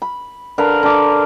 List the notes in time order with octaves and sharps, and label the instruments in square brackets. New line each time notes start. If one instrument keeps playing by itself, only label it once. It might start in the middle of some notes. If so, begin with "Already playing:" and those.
[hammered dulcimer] B5
D3 A#4 B4 F5
D3 D6